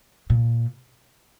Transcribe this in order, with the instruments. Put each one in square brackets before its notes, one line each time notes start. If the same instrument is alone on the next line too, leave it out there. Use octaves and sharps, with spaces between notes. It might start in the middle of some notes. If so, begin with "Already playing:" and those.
[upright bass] A#2